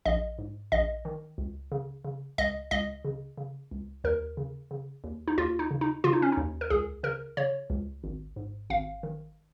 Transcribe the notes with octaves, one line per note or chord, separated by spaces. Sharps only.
A#1 D#5
G#2
A#1 D#5
D#3
C#2
C#3
C#3
C#2 D#5
C#2 D#5
C#3
C#3
C#2
D#2 A#4
C#3
C#3
D#2
D#4
D#2 F4
D#4
C#3
D#4
C#3 F4
D#4
C#4
D#4
D#2
A#4
C#2 G#4
C#3 A#4
C#3 C#5
C#2
G#1
G#2
G#1 F5
D#3